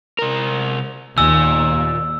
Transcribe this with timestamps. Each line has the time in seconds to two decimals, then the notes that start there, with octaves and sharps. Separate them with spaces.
0.19 C3 A#4
1.18 D#2 A#2 G#5 E6